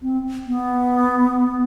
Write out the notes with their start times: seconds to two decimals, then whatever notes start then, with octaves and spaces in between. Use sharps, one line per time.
0.02 C4
0.47 B3